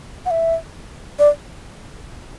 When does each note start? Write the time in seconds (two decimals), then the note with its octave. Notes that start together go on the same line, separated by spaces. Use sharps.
0.26 F#5
0.31 E5
1.19 D5